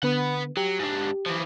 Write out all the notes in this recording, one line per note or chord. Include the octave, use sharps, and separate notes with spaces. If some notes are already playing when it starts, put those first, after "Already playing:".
D3 B3 B4 F#5
F#3 G4
G#2 D4
E3 F3